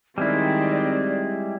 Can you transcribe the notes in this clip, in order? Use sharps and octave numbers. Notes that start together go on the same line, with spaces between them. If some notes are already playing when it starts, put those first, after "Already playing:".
D#3 G3 G#3 C4 E4 D5